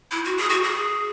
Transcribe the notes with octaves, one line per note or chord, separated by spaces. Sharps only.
E4
F#4
G#4
F#4
G#4